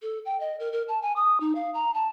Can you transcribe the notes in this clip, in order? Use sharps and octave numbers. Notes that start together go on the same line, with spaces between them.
A4
G5
D#5
A#4
A#4
A5
G#5
D#6
D#4
F5
A#5
A5